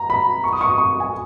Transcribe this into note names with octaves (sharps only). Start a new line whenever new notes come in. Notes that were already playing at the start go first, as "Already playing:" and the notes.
Already playing: A#5
B5
C#6
D#6
C#6
D#6
C#6
G#5